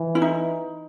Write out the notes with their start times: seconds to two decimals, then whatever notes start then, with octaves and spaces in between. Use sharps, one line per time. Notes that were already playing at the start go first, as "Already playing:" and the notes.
Already playing: E3
0.15 E4
0.22 D#4